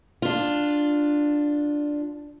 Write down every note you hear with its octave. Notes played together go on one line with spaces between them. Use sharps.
D4 F4